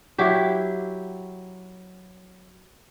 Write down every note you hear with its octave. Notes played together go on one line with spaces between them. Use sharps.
F#3 E4 G4